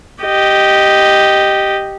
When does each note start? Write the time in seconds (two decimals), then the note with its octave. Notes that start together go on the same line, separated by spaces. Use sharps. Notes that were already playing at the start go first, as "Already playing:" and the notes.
0.22 G4 D#5